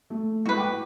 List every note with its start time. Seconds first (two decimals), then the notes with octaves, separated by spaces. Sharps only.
0.10 A3
0.45 G#3 A3 E4 F#4 B4
0.57 G5 D6